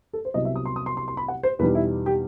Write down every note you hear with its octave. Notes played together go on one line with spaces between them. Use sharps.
A4
C5
C2 C3 F#3 B3 D#5
E5
D#6
C6
D#6
C6
C6
C6
B5
F#5
C5
E2 B2 G3 D#4 B4
E4
G4